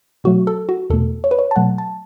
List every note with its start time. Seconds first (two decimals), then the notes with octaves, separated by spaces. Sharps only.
0.24 B2 F#3 A3 F#4
0.47 A4
0.69 F#4
0.90 E2 B2 A3 A4
1.24 C#5
1.31 B4
1.39 C#5
1.51 A5
1.56 B2 F#3 A3 F#5
1.78 A5